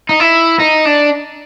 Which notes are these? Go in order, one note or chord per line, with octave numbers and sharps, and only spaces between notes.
D#4
E4
D#4
D4